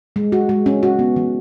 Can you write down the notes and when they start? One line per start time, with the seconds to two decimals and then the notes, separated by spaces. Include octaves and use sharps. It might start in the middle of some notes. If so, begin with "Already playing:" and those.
0.16 G#3
0.32 F#4
0.49 G#3
0.66 C#4
0.83 F#4
0.99 B3
1.16 E3